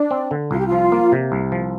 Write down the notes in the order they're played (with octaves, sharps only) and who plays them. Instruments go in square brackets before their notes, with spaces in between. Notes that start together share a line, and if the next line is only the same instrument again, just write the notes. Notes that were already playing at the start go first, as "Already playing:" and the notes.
Already playing: [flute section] D4
[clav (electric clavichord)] C4
D3
[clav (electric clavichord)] C2 [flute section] F4
[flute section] G4
F4
[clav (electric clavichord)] F3
A#3
C3
C2
F3